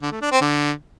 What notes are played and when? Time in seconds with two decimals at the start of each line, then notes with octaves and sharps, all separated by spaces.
0.02 D3
0.12 A3
0.22 D4
0.32 C4
0.41 D3